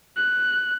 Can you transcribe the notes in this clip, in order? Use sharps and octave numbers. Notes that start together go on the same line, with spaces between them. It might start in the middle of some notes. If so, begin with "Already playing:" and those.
F#6